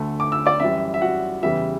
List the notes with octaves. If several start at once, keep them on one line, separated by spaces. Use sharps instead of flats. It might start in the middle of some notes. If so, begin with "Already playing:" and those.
Already playing: D2 D3 A3
D6
E6
D5 D6
F#2 E3 G3 E5
E5
F#4 F#5
E2 C#3 E3 G3 E5